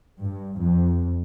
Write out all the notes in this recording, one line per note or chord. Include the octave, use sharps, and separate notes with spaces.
G2
F2